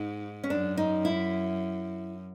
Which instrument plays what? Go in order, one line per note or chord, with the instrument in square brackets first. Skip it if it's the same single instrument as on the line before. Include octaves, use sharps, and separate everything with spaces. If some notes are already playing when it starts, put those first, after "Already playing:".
Already playing: [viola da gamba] G#2 [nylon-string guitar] D#4
[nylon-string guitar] C#4
[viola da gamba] F#2 [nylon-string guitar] D4
[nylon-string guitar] D#4
E4